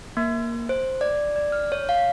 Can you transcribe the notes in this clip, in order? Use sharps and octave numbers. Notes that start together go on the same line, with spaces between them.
A#3
C5
D5
D5
F6
C#5
F5